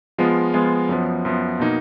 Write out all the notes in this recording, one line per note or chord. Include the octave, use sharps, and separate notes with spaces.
F3 G#3 B3 F4
F3 G#3 B3 F4
F#2 F3 B3
F#2 F3 B3
B2 A#3 D#4